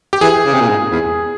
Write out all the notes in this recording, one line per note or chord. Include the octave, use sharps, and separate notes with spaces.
G4
E3 G#4
C#3
C3
A#2
G#2
E2